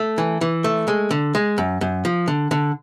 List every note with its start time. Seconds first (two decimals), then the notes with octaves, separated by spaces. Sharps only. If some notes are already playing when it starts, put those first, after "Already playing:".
Already playing: A3
0.18 E3
0.41 E3
0.64 A3
0.88 G#3
1.11 D3
1.35 G#3
1.58 F#2
1.81 F#2
2.05 F3
2.28 D3
2.51 D3